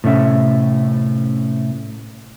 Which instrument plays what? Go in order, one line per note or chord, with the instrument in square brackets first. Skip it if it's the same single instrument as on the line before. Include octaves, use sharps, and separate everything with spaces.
[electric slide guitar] A2 C3 A3 C#4 E5